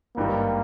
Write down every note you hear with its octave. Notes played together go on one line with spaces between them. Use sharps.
G#1 G2 D#3 G3 A#3